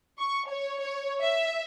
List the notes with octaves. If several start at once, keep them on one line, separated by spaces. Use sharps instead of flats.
C#6
C#5
C#5
E5